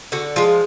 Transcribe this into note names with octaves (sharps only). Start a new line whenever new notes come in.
D3 F#4
F3 G#3 F4